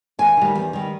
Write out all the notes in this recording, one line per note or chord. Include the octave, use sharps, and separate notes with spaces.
E2 G#5
D#3 G3
E2
D#3 G3